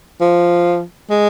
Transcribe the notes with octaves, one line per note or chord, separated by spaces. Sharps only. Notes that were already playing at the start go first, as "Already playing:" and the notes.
F3
G#3